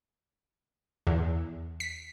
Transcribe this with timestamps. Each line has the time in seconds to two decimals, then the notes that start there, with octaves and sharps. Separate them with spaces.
1.07 E2
1.80 B6